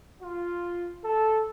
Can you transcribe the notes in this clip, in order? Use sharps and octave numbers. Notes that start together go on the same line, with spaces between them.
F4
A4